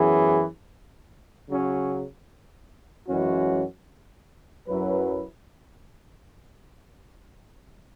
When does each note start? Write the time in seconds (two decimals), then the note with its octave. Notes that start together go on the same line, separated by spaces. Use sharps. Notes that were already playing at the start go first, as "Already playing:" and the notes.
Already playing: F#2 E3 B3 G#4
1.48 C#3 F#3 C#4
3.08 F#2 E3 G#3 C#4 F#4
4.68 F#2 F#3 E4 B4